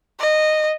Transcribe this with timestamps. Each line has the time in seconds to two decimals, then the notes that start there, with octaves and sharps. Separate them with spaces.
0.20 D#5